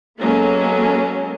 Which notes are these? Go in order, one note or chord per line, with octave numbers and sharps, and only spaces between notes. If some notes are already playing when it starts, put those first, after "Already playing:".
F#3 G#3 A#3 B3 C#4 A4